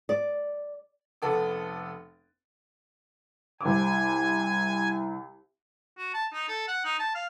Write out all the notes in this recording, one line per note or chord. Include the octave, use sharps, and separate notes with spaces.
D5
F1 B3 A4 F#5 D6
C2 G#5 D6
F#4
A5
D#4
A4
F#5
D#4
A5
F5